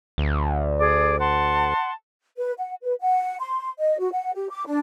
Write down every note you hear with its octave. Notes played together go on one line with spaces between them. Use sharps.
D2
G#4 D5
F#5 A5 C6
B4
F#5
B4
F#5
C6
D#5
F#4
F#5
G4
D6
D4